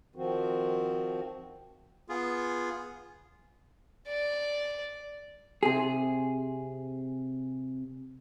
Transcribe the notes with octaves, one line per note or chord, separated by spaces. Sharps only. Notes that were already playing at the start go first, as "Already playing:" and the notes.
D#3 F3 C4 F#4
B3 F4 G#4
D5
C3 G#4